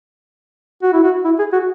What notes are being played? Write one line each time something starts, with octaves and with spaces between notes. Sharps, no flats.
F#4
E4
F#4
E4
G#4
F#4